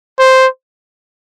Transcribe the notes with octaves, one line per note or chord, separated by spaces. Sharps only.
C5